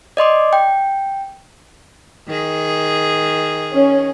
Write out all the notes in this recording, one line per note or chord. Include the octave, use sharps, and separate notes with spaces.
D5 D#5 C6 D6
G5
D#3 G#4
C#4